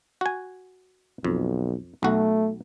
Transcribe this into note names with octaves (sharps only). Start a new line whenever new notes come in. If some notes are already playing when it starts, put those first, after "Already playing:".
F#4 G#5
B1 F2
B1 A3 F#4